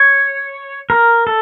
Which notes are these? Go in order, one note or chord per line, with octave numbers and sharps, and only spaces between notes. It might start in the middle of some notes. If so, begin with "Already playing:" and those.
Already playing: C#5
A#4
A4